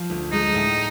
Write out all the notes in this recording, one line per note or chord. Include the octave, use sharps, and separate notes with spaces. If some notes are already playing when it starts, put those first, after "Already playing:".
Already playing: F3
D2
G#3 D#4
A2